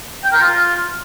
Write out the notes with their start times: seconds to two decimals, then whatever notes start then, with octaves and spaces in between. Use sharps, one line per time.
0.24 G5
0.32 A#4
0.40 F4